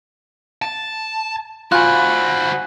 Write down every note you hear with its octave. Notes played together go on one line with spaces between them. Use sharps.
A5
F4 F#4 C5 G#5 B5 F#6